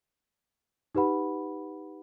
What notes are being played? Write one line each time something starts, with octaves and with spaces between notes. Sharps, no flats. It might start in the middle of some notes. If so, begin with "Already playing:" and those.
D#4 G4 B4 F#5 B5